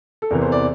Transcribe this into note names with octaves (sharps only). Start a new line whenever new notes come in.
A4
E2 C3 E3 A#4
C5
D5